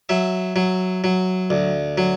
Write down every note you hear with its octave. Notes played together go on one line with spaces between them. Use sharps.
F#3 E5
F#3
F#3
D2
F#3